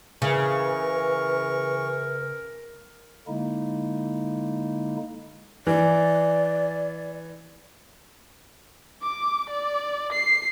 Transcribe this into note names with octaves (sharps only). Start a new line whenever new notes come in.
C#3 E3 A#4 B4 C#6
D3 G#3 A#3 D#4 E4
E3 D5
D6
D5
C7